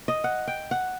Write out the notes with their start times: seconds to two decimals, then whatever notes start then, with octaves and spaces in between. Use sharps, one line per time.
0.08 D#5
0.24 F#5
0.48 G5
0.71 F#5